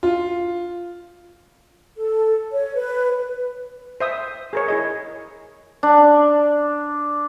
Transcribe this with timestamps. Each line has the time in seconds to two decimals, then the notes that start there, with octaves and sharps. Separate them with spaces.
0.03 F4
1.97 A4
2.52 C#5
2.75 B4
4.00 C5 E5 D#6
4.53 G#4 A#4 C#5
4.68 E4 G#4 D#5
5.83 D4